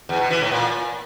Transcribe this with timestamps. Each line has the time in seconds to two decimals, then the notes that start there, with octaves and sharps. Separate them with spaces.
0.09 E2
0.20 B2
0.30 E3
0.41 A2
0.52 A#2